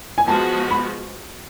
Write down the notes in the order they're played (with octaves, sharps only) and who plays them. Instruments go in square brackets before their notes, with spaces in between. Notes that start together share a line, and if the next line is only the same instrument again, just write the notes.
[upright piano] G#5
[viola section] F3 G#3 B3 F#4 [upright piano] A5
[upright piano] B5